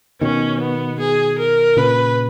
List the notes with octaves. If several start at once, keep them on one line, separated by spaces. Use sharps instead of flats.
B2 D#3 C#4
B3
G#4
A#4
A#2 C#3 B4